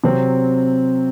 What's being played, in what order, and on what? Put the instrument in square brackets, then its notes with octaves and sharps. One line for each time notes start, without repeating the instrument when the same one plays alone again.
[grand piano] C3 F#3 C4